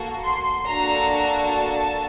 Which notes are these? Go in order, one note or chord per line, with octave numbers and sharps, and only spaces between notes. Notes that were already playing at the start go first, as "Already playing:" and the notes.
Already playing: A#3 F#4 A4
C6
A#3 D4 F#4 A4 A#5
A5